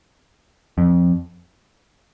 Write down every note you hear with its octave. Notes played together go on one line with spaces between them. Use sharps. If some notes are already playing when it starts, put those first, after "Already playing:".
F2